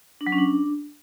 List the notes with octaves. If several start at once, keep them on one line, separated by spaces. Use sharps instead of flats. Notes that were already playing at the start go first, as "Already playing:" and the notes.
D4
F#3
C#4
D4